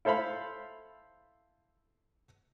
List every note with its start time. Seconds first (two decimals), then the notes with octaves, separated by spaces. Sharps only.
0.05 E4 A4 C5 F5 B5